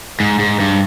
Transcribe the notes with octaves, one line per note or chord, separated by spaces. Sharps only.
G#2
G#2
G2